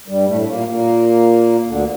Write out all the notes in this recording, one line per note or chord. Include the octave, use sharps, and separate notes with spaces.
G2 G3
A2 A3
A3
A#2 A#3
A#2 A#3
D2 D3